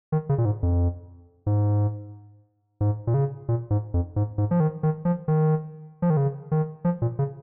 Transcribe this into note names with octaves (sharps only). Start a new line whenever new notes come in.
D#3
C#3
A#2
G#2
F2
G#2
G#2
A#2
C#3
A#2
G#2
F2
G#2
G#2
F3
D#3
D#3
F3
D#3
F3
D#3
C#3
D#3
F3
A#2
C#3